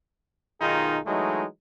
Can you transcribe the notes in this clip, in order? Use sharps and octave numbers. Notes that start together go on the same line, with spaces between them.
B1 D#3 D#4 F4 G#4
E3 F#3 G#3 A3 D#4